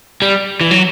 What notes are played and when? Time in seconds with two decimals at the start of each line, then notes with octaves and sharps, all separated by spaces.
0.22 G3
0.61 E3
0.71 F#3